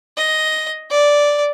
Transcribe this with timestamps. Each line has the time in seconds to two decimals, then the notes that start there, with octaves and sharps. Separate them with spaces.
0.17 D#5
0.90 D5